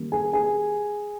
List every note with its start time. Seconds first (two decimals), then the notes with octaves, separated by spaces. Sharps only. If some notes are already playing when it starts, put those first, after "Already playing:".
Already playing: D#3 G3 A#3 C#4
0.12 G#4 G#5
0.33 G#4 G#5